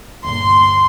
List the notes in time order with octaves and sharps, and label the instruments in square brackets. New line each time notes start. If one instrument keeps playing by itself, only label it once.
[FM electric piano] D2 G2 A#2 [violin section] C6